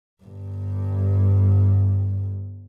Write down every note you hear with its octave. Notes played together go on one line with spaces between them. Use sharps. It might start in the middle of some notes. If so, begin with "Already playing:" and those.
G1 G2